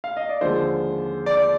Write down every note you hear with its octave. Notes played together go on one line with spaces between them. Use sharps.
F5
D#5
D5
D#2 D3 F3 G#3 C5
D5